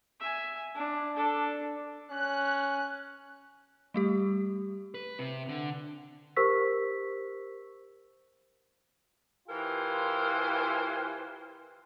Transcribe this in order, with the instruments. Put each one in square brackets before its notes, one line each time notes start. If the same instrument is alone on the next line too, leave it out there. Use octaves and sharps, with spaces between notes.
[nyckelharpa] E5 G#5
D4
D4 A4
[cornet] C#4 [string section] F#6
[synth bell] G3 A3 G4
[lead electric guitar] B4
C3
D3
[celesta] G4 A#4 C5 C#6 E6 B6
[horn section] E3 F4 G4 A#4 C5 G#5